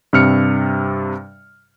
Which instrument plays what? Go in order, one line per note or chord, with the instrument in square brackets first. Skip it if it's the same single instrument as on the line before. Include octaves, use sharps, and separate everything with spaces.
[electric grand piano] G2 C3 F6 C#7